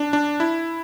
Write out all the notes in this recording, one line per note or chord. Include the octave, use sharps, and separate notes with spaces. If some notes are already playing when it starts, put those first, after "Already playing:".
Already playing: D4
D4
E4